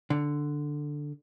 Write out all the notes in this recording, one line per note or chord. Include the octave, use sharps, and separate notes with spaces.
D3